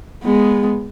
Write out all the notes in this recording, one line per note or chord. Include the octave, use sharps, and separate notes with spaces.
G#3 B3